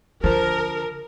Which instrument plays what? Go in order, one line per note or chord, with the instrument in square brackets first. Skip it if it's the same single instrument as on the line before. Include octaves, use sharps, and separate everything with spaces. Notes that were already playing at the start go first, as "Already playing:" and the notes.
[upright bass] D3 [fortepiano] F3 [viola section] A#4